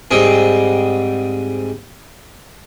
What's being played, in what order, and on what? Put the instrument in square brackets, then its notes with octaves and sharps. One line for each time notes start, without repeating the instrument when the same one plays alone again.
[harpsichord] G#2 G3 C4 G#4